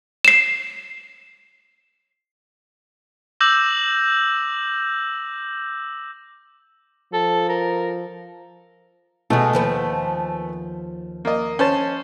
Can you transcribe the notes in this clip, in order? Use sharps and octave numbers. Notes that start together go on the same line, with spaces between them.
C7 E7
D6 E6 G6 A#6 F#7
F3 A4
A#4
B2 G#3 A3 B3 G#5
D#2 F3 B4
A#3 D#5
C#4 C5 A5